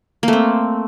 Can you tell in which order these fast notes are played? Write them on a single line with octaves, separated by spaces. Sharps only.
A#3 A3 C4